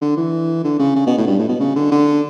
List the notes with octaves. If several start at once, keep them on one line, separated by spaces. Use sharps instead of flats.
D3
E3
D3
C#3
C#3
B2
A2
G2
A2
B2
C#3
D3
D3